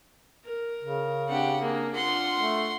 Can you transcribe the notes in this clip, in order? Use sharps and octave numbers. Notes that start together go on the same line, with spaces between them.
A#4
C#3
C4 D4 G4 F#5
A#3 D4 G#4
D4 F4 F#5 C6
A3